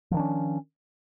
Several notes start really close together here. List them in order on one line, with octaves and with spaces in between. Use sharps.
F3 D#3 D4 C#4